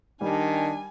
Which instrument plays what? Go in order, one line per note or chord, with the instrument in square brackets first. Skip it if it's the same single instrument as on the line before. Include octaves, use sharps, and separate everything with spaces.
[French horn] D#3 [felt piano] G3 [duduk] D4 [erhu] G#5